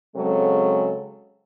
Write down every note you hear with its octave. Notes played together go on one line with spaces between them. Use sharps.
C#3 F#3 G#3 C4 G#4 A4